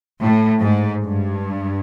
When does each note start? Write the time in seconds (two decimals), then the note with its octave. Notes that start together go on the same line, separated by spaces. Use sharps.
0.21 A2
0.62 G#2
1.03 G2